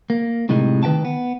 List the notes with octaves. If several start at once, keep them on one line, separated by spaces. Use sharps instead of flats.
A#3
A2 C3 G3 G#3 D#4
D#3 B4 E5 G5 A5
B3